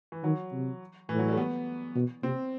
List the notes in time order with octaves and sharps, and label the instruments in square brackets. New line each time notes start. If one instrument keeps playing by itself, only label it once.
[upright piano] E3
[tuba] D#3 [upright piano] F#3
[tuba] C3
[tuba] A2 [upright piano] E3
[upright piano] F#3
G3
A3
B3
[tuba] B2
[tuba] C3 [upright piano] C4